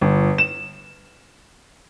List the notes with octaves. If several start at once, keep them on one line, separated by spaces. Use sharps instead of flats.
G1
E7